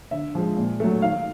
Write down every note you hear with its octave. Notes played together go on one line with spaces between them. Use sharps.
D3 E5
F3 G#3
A#2
F#3 A3
D#3 F5